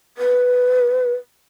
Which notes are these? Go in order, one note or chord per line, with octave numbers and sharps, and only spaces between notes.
B4